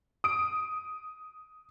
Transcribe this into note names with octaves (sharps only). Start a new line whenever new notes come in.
D#6 D7